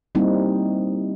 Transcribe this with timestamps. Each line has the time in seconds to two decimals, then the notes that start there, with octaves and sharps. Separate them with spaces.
0.15 G3 A#3 C4 D#4 E4